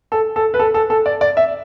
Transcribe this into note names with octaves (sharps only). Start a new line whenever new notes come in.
A4
A4
B4
A4
A4
A4
D5
D5
E5